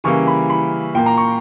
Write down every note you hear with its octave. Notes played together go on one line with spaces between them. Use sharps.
C#3 E3 G3 A#3 C#6
B5
B5
A#2 A#3 G5
A#5
C#6